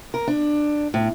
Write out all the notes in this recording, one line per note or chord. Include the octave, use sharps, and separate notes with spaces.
A#4
D4
A2